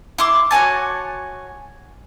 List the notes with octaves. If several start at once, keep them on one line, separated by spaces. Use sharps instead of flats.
E4 C6 D6
F#4 C#5 G#5 A5